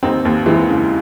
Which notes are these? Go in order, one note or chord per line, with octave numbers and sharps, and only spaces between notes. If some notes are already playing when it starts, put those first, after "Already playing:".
D#2 C4 D#4
D#2
E3 G#3 C4
C#3